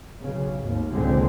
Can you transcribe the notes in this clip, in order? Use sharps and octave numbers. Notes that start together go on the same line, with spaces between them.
B1 C#3
G#1 D#2
F1 C#2 A#2 D3 G#3 C4